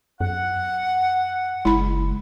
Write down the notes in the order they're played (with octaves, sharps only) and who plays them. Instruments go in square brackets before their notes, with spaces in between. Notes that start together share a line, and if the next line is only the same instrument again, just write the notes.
[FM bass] F#2 [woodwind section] F#5
[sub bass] F#1 [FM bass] G#3 [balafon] E4 B5